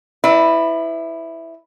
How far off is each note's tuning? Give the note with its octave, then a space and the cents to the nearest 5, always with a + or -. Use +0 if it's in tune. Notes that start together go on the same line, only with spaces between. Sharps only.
E4 +0 B4 +40 D5 +45